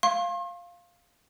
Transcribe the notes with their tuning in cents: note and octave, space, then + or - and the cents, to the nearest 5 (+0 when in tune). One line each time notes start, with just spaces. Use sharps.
F5 +0 C6 +40